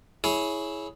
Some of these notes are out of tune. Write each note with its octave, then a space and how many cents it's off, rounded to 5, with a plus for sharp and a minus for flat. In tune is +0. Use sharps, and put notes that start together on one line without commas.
E4 -10 G#4 +15 C#5 +5